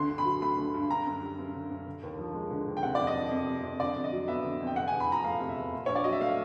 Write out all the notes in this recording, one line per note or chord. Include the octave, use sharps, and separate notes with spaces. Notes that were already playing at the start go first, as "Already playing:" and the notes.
Already playing: D2 D3 C6
G2
B5
F#3
A3 B5
D3
G2
D3 A#5
F#2
G3
F#2
D3
F#2
D3
D#2
F3
G#3
D3
D#2
G5
C3 F#5
F2 D5
D#5
F3
F2
C3
F2
D3 D5
F2
D#5
F#3
B3 E5
D3
F2
G5
C3 F#5
E2 G#5
B5
F3 A#5
A3 F5
C3
E5
E2
A#2
A#1 C#5
D5
F#3 D#5
E5
A3 F5